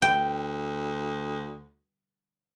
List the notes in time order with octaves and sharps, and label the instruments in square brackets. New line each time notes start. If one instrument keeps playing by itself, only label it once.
[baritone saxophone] D2 [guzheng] G5